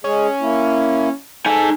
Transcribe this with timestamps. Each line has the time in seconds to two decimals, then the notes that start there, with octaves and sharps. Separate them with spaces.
0.04 G#3 C#4 G#4
0.40 A#3 E4
1.46 D#4 A4 G#5